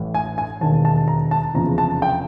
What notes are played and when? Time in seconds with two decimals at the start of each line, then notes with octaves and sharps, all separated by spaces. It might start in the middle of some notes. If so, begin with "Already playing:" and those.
Already playing: A1 A2 E3
0.14 G#5
0.38 G#5
0.61 E1 D#2 D#3 A5
0.85 A5
1.08 A#5
1.31 A5
1.54 F1 E2 C#3 F3 A#5
1.78 A5
2.02 G5